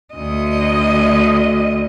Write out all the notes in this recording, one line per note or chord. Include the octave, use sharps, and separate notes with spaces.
D2 D#5